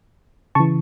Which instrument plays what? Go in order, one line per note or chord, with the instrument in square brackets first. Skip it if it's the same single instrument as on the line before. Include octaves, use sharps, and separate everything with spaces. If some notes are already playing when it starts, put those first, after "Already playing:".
[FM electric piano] C#3 E3 A5 C#6